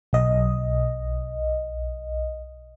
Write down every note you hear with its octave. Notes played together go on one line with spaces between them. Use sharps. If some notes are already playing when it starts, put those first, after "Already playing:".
B1 D#5